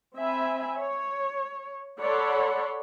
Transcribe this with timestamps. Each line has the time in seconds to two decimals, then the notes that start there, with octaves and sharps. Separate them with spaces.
0.16 C4 E5 G#5 B5
0.79 C#5
2.01 A4 C#5 D5 F#5 B5 C6